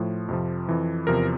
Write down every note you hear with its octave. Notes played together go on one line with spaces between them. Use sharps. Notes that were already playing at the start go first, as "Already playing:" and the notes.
Already playing: A2 F3
F2 C3 F3
F2 E3
E2 C3 F3 A#4